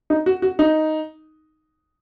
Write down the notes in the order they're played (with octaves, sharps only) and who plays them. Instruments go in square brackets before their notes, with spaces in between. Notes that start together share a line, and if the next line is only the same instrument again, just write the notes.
[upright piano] D#4
F#4
F#4
D#4